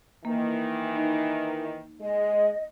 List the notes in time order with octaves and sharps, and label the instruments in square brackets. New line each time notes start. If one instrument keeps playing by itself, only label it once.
[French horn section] D#3 E3 [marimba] A#3
[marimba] D#4
[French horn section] G#3 [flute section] D#5